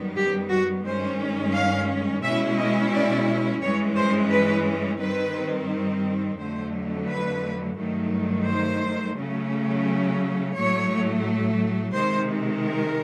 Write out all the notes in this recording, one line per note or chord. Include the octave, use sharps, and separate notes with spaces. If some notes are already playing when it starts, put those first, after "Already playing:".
Already playing: F#2 D#3 G3 B3
G4
F#4
G2 D#3 G#3 C#4 C5
F5
B2 G#3 C#4 E4 E5
D#5
D5
G2 E3 G#3 C#4 C#5
C5
B4
G2 D#3 G3 C4 B4
F2 D3 F#3 A3 C5
B4
G2 D#3 F#3 A3
C5
C#3 F#3 A3 C#4
A2 F#3 A3 C#5
C3 D#3 G#3 C5
A#4